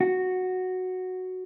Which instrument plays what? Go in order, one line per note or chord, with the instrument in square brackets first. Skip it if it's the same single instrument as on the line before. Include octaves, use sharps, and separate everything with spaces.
[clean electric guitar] F#4